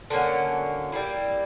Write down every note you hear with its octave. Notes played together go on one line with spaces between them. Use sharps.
D3 F#3 A#3 C#4
G3 A#3 E4